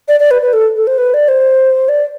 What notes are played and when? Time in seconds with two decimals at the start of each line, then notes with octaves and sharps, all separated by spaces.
0.08 D5
0.20 D5
0.31 B4
0.42 B4
0.53 A4
0.76 A4
0.87 C5
0.98 B4
1.14 D5
1.28 C5
1.89 D5